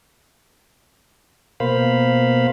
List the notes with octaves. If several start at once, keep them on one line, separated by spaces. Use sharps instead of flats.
B2 A#3 C5 F5 B5